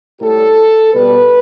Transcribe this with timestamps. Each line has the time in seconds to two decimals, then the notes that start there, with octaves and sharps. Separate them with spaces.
0.21 A2 G3 A4
0.93 B2 G3 B4